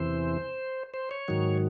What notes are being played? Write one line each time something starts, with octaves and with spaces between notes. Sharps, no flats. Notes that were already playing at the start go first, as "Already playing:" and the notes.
Already playing: E2 C3 E3 C5
C5
C#5
G#2 D#3 F#3